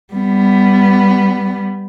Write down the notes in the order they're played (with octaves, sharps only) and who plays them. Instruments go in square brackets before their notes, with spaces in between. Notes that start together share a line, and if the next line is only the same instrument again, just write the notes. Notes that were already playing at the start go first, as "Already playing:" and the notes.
[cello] G3 B3